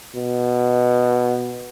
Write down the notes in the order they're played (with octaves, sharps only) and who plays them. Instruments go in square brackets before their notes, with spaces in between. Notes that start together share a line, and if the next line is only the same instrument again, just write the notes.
[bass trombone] B2